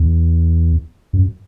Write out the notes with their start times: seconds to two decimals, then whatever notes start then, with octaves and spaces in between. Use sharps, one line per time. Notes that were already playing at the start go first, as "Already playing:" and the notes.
Already playing: E2
1.13 F#2